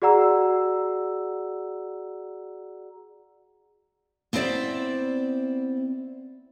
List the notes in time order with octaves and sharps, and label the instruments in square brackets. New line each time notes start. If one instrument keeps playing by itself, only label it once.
[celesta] F#4 G#4 D5 F#5 A#5 E6
[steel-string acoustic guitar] B3 C4 E4 C5 D5 E5